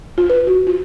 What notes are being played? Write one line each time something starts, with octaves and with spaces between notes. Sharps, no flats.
F4
B4
F#4
F4